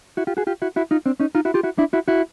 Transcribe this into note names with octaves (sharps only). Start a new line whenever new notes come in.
E4 F#4
F4 G4
F#4 G#4
F4 G4
E4 F#4
E4 F#4
D#4 F4
C4 D4
C#4 D#4
D#4 F4
E4 F#4
F4 G4
E4 F#4
D4 E4
E4 F#4
E4 F#4